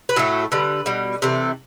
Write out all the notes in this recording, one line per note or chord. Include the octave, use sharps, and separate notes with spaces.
B4
A2 F#3 A3 A4
D3 G3 B4
B2 G3
C3 E3 A3